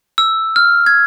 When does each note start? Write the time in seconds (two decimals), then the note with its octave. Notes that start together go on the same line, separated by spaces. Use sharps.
0.18 E6
0.56 F6
0.86 G#6